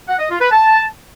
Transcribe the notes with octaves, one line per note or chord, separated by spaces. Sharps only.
F#5
D#5
F4
B4
A5